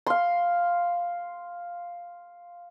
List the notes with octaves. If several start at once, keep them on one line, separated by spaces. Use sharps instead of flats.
F5 C6